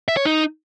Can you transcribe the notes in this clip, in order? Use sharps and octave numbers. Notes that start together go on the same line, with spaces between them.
E5
C#5
D#4